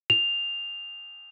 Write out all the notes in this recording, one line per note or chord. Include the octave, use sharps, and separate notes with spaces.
F7